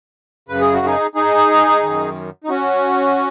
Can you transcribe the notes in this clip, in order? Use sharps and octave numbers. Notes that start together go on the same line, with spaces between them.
F#2 C#3 B4
G#4
F#4
D#4 G#4
D#4 G#4
F#2 D#3
D#4
C#4 F#4